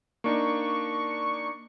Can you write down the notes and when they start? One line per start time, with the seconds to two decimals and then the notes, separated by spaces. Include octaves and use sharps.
0.24 A#3 D4 D#4 C#6